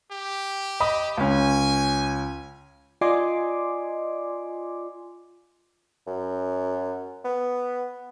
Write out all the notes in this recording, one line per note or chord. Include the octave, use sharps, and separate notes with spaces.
G4
D#5 B5 D#6
C#2 C#4 G#5
F4 D5 D#5 G#5 C6 D6
F#2
B3